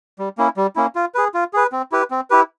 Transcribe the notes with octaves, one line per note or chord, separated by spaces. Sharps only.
G3
A#3 C#4 E4
G3
A#3 C#4 E4
F4
G#4 B4
F4
G#4 B4
C4
E4 G4 B4
C4
E4 G4 B4